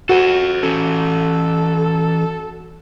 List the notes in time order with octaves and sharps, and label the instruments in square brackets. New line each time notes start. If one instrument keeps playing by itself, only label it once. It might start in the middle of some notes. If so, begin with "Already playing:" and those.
[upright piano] F#4 [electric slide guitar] A4 C5
[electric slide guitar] E3 C#4 [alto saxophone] A4